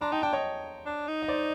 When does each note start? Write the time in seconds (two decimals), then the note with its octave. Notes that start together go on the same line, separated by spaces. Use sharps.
0.01 D4 A#5 C6
0.12 D#4 G5 A5
0.22 D4 G5 A5
0.33 C#5 D#5
0.86 D4
1.08 D#4
1.22 D#5
1.28 C5 D5